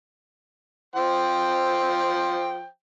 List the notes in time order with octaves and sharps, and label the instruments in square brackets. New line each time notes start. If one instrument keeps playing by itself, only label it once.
[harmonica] F3 C5 G5